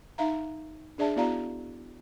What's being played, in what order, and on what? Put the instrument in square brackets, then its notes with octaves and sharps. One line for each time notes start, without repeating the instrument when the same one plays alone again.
[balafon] D#4 E5 F5 A#5
D4 G#4 D5 E5 A5
B3 E4 F#4 D5 F5 A#5